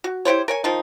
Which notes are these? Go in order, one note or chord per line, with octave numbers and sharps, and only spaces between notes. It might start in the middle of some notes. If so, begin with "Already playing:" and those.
F#4
E4 G4 C5 C#5
A#4 C#5 G#5
D#3 F3 D#4